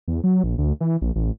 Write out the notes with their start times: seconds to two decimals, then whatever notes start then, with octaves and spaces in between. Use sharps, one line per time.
0.08 E2
0.24 F#3
0.44 A#1
0.58 D2
0.81 E3
1.01 A#1
1.16 A1